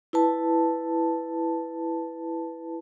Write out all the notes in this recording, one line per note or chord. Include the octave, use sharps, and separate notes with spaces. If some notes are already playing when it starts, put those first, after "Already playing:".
E4 B4 A5